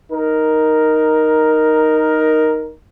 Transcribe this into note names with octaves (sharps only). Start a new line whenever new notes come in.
D#4 A#4